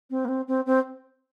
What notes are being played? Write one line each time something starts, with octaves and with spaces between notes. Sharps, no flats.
C4
A#3
C4
C4
C4